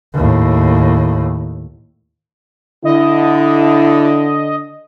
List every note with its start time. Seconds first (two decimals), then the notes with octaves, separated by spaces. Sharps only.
0.14 D#2 A2
2.85 D3 E4 D#5